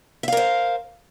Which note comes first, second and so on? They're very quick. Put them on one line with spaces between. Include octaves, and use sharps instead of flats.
E5 F5 A#4 C5